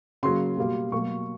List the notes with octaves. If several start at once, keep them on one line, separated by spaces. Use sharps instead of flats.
C#3 F#3 A#3 C6
B2 G3 A#3
B2 F#3 A#3 C#6